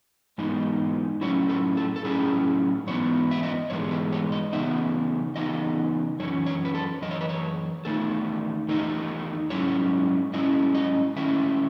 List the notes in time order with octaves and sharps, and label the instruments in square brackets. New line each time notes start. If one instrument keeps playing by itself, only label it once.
[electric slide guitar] G#2 E3 G#3 B3 D#4
A2 F#3 C#4 E4 C#5
A4
A4
A4
A2 F#3 C#4 E4 G#4
G#2 E3 B3 C#5
E5
D#5
G#2 E3 G#3 B3 C#5
B4
C#5
D#5
C#3 E3 B3 D#4 E5
C#3 E3 B3 D#4 D#5
F#2 E3 C#4 C#5
C#5
B4
A4
F#2 E3 D#5
C#5
B4
C#5
E2 D#3 A3 D#4 A4
E2 D#3 A3 D#4
G#2 F#3 C#4 E4 C#5
G#2 F#3 C#4 E4 D#5
D#5
D#3 A3 C#4 E4 E5